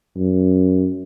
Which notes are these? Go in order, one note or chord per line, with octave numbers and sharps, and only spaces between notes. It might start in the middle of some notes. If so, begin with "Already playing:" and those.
F#2